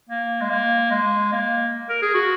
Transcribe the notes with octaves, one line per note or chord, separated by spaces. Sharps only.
A#3
G#3
A#3
G#3
A#3
A#4
G#4
F#4